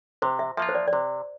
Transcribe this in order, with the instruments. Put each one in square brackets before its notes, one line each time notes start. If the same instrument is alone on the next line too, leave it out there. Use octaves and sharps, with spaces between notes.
[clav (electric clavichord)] C3 [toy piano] C5
[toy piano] E5
[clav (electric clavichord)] F3 A#3 F4 [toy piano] E5
[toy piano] C5
D5
D5
[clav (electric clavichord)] C3 [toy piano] C5